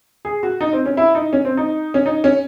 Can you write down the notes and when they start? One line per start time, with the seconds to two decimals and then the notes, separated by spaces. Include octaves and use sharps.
0.25 G#4
0.43 F#4
0.61 D#4
0.73 C4
0.86 C#4
0.97 E4
1.15 D#4
1.33 C#4
1.45 C4
1.57 D#4
1.94 C#4
2.06 D#4
2.24 C#4